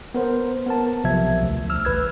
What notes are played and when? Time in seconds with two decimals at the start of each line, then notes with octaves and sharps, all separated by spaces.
0.14 B3 A#4 C5
0.66 B3 A#4 A5
1.04 B1 C3 F3 E5 G#6
1.43 D2
1.69 C2 E6 F6
1.85 A1 D2 B4 E6 G#6